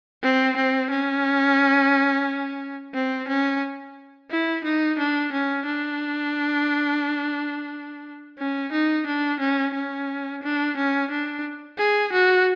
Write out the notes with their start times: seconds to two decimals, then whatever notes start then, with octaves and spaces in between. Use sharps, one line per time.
0.23 C4
0.56 C4
0.90 C#4
2.94 C4
3.28 C#4
4.31 E4
4.64 D#4
4.98 D4
5.32 C#4
5.66 D4
8.39 C#4
8.73 D#4
9.07 D4
9.40 C#4
9.74 C#4
10.43 D4
10.77 C#4
11.11 D4
11.78 G#4
12.13 F#4